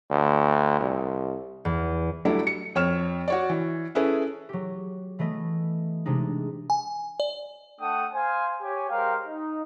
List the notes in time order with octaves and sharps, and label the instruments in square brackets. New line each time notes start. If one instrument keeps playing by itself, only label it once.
[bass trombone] D2
C2
[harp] E2
[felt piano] F#3 G3 A3 D4 E4
C#7
F2 C#5 F6 E7
F#4 C#5 D5
E3
C#4 E4 G#4 A4 B4
[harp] F#3 G4
E3 A3 B3 D#5
C3 G#3 D4 D#4
[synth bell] G#5
D5
[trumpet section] A3 D4 A4 F#5 G5 D#6
C5 F5 G#5
G4 C#5 G#5
G#3 G4 A#4 C5 F5 G5
D#4